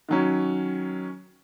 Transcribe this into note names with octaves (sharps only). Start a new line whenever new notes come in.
D#3 F#3 C#4